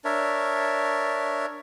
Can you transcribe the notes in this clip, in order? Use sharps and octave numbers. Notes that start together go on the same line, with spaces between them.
D4 A#4 C#5 E5